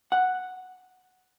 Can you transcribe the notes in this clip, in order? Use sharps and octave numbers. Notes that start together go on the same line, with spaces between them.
F#5